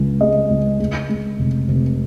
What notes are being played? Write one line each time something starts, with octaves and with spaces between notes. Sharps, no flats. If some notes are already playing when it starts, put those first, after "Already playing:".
Already playing: C#2 C#3
G#3 D#5
C#2
G#3
G#3
F1
F1